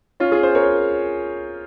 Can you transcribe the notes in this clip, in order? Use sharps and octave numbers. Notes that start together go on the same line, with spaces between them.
C#4 F4
F4 G#4
G#4 C5
A#4 C#5